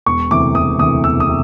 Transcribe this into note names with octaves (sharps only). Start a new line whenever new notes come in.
E1 C#6
D2 C3 E3 D6
E1 D#6
D2 C3 E3 D#6
E1 E6
D#6
C3